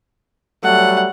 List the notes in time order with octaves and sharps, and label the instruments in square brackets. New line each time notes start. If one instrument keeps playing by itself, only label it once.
[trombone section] F#3 G3 A3 [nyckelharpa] F#5